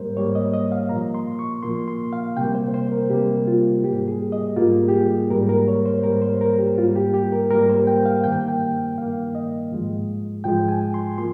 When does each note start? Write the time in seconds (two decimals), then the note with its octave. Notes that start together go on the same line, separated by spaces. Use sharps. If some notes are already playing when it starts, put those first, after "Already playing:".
Already playing: G#2 G3 A#3 A#4 C5
0.16 G#2 G3 A#3 C#5
0.35 D#5
0.54 D#5
0.72 F5
0.89 A#2 F3 A#3 A#5
1.14 C6
1.39 C#6
1.63 A#2 F3 A#3 C6
1.88 C6
2.13 F5
2.37 C3 G3 A#3 G5
2.55 C5
2.74 C5
2.92 A#4
3.10 C3 G3 A#3 G4
3.47 F4
3.84 G#2 G3 A#3 G4
4.08 G#4
4.32 D#5
4.56 G#2 G3 A#3 F4
4.88 G4
4.93 G#4
5.30 G#2 G3 A#3 A#4
5.49 A#4
5.68 C#5
5.86 C5
6.04 G#2 G3 A#3 A#4
6.22 C5
6.41 A#4
6.58 G4
6.77 G#2 G3 A#3 F4
6.96 G4
7.14 G4
7.32 A#4
7.51 G#2 G3 A#3 A#4
7.69 C5
7.87 G5
8.06 F5
8.24 G2 D#3 A#3 G5
8.48 G5
8.98 G2 D#3 A#3 F5
9.35 D#5
9.71 G#2 F3 G#3
10.44 G#2 F3 G#3 G5
10.68 G#5
10.94 C6
11.18 F3 A#3 C6